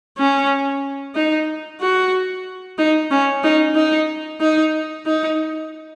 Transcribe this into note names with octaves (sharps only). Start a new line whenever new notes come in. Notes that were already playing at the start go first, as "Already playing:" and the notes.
C#4
D#4
F#4
D#4
C#4
D#4
D#4
D#4
D#4